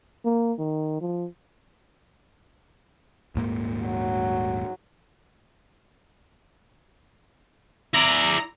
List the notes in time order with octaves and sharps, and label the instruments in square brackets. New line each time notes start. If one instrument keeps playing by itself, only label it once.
[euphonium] A#3
D#3
F3
[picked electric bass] D#1 G#2 A#3
[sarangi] F#3
[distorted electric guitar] E4 D5 [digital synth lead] A#5